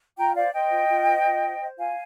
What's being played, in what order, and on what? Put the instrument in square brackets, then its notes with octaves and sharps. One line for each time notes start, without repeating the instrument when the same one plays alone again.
[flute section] F4 G5 A#5
C5 D5 F5
C5 D#5 G5
F4
F4
C5
F4
C5
C5
F4 F5 G#5